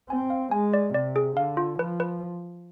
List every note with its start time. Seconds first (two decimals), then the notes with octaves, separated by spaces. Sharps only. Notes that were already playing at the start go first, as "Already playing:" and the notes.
0.09 C4 G#5
0.30 F5
0.51 G#3 G#5
0.74 D5
0.94 C3 D5
1.16 G#4
1.36 D3 F5
1.57 F4
1.79 F3 B4
2.00 B4